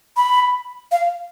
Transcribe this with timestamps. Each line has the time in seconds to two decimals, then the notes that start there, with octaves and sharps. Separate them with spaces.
0.17 B5
0.91 F5